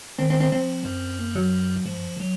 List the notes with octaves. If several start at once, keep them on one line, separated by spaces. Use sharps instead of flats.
D#3 C4
C4
C4
F3 C4
F#2
A#3
F#3
G#2 F3
F#2
F2
F#3